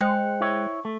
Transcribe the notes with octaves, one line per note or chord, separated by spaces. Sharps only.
G#3 C5 G5 F#6
E4 C#5
A3